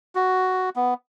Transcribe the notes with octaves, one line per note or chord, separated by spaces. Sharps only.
F#4
B3